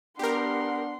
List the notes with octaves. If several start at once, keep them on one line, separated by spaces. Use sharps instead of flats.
B3 D4 G4 A#4 F#5 C6